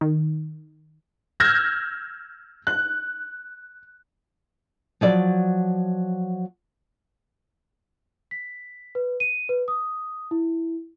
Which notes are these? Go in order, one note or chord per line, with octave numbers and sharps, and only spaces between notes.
D#3
E6 F6 G6 G#6 A#6
F#6
F3 F#3 D5
B6
B4
D#7
B4
D#6
E4